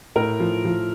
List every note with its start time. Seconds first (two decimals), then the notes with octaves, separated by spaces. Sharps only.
0.16 A2 A#4
0.40 F3
0.65 F3